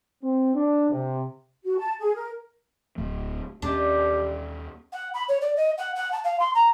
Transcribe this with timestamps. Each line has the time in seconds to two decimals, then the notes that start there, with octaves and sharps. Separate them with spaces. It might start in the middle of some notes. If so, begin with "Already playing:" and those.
0.24 C4
0.54 D4
0.90 C3
1.65 F#4
1.78 A5
2.00 G#4
2.15 A#4
2.98 D1 A3
3.62 D#2 A#3 C#4 D4 G4
4.92 F#5
5.14 B5
5.28 C#5
5.41 D5
5.56 D#5
5.78 F#5
5.95 F#5
6.12 A5
6.24 F5
6.39 C6
6.54 A#5